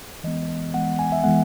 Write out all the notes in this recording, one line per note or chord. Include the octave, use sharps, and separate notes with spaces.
E3 G#3 B3 D#5
E3 G#3 B3 F#5
G#5
E5
E3 G#3 B3 F#5